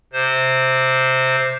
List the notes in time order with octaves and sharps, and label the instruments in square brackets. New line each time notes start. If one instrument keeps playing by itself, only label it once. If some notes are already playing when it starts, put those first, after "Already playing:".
[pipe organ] C3 C5